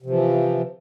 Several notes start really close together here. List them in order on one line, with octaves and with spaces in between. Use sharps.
C3 F3 E3